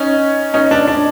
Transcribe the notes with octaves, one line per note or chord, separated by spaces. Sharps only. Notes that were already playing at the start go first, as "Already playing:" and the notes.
Already playing: C#4 D#4
C#4 D#4
D4
D4